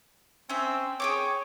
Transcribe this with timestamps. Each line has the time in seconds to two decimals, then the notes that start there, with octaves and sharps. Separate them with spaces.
0.49 C4 C#4 E5
1.00 G#4 C#5 G5 D6